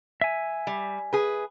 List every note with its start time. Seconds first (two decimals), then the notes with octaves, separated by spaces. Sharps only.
0.21 E5 G#5
0.67 G3
1.13 G#4 B4